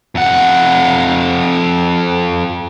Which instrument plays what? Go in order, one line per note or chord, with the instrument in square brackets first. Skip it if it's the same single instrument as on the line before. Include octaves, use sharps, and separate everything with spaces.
[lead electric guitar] F2 F#5